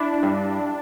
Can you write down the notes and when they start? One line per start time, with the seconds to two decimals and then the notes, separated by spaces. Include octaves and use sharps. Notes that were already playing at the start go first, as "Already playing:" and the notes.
Already playing: D4 E4
0.23 G2